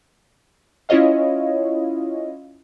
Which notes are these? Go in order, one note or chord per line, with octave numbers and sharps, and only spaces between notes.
C#4 E4 F4 C#5 D#5 F5